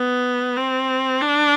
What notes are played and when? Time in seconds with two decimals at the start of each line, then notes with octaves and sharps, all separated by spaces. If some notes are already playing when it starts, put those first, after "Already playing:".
Already playing: B3
0.56 C4
1.21 D4